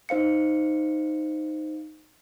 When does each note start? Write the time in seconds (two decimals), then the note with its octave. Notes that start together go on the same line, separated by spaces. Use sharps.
0.09 D#4 C5 F5 C#7